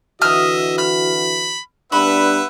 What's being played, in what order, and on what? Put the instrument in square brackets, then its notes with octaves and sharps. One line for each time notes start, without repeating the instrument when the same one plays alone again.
[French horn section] D3 E3 F#4 [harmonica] D#5 E5 [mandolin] D#6 F6
[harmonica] B5 [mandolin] F6
[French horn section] G3 B3 D4 [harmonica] B4 E5 F#5 [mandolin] B5